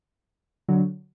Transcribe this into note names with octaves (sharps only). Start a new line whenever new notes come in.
D3 F#3